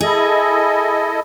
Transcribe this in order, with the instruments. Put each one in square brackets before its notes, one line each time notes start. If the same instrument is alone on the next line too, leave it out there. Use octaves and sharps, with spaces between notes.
[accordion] E4 A4 D#5 [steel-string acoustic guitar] G#4